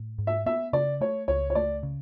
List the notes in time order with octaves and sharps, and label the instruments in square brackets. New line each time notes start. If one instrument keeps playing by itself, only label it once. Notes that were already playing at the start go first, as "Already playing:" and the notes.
Already playing: [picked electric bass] A2
G#2
[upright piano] E5
[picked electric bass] B3 [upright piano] E5
[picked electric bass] C#3 [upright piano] D5
[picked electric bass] A3 [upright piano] C#5
[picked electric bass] C#2 [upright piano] C#5
[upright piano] C#5
[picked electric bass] A3 [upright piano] D5
[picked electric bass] C#3